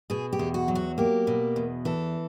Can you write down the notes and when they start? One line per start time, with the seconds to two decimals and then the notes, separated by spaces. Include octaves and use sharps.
0.10 B2 G#4
0.33 G4
0.39 E2
0.54 F#4
0.68 F#3
0.75 F#4
0.98 A#3 G4
1.27 B2
1.56 E2
1.85 E3 A4